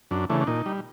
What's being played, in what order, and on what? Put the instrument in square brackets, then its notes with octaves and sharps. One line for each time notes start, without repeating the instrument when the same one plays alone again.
[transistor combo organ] F#2 D4
C#3 E3 A3 D4
D4
A#2 D#4
G3